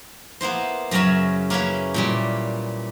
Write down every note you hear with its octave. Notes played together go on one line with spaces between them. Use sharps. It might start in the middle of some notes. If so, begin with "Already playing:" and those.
A#3 B3 E4 C5
F#2 C#3 C#4 A#4 E5
A#3 C#4 E4 B4
A#2 E3 G3